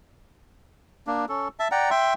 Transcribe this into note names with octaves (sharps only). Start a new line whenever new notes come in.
A#3 D4
C#4 A4
E5 A5
D5 F#5 G5 A#5
E5 G5 C6